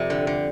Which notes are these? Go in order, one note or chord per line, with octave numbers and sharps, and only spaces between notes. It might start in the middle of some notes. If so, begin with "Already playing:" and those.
Already playing: F2 C3 G3
D3
D3